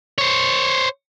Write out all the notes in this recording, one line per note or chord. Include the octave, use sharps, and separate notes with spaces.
C5 C#5